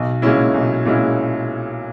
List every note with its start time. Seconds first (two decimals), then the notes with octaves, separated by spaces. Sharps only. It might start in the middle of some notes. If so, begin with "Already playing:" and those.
Already playing: B1
0.22 A#2 G#3 C#4 E4
0.54 B1
0.85 A#2 G#3 C#4 E4